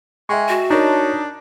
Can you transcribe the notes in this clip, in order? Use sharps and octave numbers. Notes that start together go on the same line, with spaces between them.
G#3 E5 G5 C#6
F#4
D4 D#4 A#4 C#5 A5